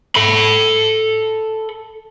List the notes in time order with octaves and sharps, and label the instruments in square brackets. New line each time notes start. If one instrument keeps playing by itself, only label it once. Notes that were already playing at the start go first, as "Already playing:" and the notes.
[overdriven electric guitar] A4 B5